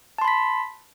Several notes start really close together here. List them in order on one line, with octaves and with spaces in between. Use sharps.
A5 C6 B5 B6